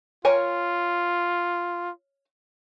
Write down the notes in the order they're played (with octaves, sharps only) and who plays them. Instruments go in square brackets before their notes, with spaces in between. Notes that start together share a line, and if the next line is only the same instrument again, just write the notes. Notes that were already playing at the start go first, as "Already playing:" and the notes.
[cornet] F4 [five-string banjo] A#4 C#5 G#5